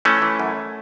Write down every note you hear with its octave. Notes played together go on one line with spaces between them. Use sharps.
E3 A3 C#4
E3
F#2